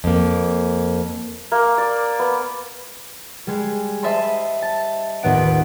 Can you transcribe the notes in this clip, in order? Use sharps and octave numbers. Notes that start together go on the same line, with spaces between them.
F2 A#3
A#3
D5
B3
G3 G#3
C5 D#5 E5 A5 B5 C6
A5
D#1 A1 B3 F#5 D7